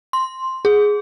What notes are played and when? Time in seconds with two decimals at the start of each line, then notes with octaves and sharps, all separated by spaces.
0.13 C6
0.65 G#4